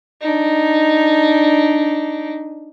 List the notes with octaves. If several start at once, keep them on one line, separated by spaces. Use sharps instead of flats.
D4 D#4